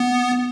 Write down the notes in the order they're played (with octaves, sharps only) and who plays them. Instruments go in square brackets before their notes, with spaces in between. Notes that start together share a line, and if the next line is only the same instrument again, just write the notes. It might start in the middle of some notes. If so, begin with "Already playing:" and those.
Already playing: [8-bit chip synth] B3